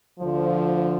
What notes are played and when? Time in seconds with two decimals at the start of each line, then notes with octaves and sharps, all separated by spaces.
0.19 D2 D3 F3